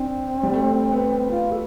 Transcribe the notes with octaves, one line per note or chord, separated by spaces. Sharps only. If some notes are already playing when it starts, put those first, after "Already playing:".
Already playing: C4 D4
G3
A3
B3
F4
A4